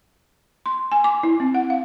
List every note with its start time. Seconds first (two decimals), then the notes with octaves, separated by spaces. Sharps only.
0.66 C6
0.92 G#5
1.04 D6
1.23 E4
1.40 C4
1.54 F#5
1.70 F5